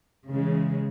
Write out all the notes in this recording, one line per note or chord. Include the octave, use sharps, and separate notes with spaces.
C#3 E3 G#3